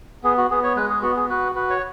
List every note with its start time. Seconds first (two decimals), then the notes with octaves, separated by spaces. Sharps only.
0.24 B3 G#4
0.38 F#4
0.51 B3 G#4
0.64 C#5
0.76 G#3 B4
0.90 G#4
1.02 B3 F#4
1.17 G#4
1.30 F#4 B4
1.55 F#4 B4
1.70 C#5